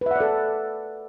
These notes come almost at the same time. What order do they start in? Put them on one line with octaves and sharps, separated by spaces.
B4 E5 F#5 D5 A4